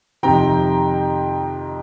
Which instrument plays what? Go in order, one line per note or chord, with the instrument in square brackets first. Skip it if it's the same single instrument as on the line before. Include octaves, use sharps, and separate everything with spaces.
[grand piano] F2 C3 D#3 G5 A#5